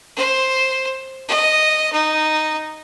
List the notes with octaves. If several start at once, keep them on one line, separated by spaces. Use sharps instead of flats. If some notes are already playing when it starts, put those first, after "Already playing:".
C5
D#5
D#4